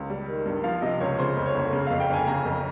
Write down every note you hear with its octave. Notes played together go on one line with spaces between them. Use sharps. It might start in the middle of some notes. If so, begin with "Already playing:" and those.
Already playing: C#2
G3
D#3
G2
F3 F5
C3 D#5
C#2 C#5
C#3 C5
F2
C#5
G1
C#3
F2 F5
G5
G1 G#5
C#3 A#5
F2